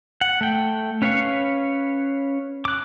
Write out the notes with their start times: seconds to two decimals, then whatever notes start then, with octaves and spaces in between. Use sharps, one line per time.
0.21 F#5
0.41 A3 G5
1.02 C#4 B4 C#5 F5 C#6
2.65 D6 F#6